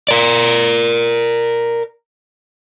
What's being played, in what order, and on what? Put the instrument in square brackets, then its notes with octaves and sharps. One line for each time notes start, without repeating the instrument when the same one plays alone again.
[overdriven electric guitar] A#4 D5